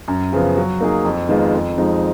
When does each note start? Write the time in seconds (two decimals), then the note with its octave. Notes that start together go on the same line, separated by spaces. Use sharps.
0.08 F#2
0.33 C#3 F3 B3
0.57 F#3
0.81 A#3 D#4 G#4
1.05 F2
1.29 D#3 G#3 B3 F4
1.53 F2
1.78 F3 G#3 D#4